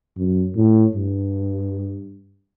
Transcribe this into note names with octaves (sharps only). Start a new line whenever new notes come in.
F#2
A2
G2